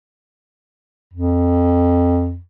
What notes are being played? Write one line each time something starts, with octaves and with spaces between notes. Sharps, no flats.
F2